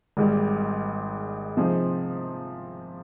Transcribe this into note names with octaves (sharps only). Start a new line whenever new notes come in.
G#1 G#2 G3
C3 F3 C4 D#4 G#4